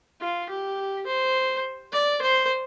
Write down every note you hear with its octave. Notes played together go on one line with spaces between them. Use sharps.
F4
G4
C5
D5
C5